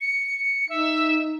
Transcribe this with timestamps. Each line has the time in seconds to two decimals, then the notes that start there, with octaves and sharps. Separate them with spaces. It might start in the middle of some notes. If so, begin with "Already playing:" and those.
0.01 C#7
0.69 D#4 E5